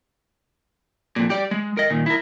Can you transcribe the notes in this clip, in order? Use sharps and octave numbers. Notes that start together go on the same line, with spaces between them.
F2 A#2
G4 D5
G#3
A#4 D#5
A#2 D#3
E4 A#4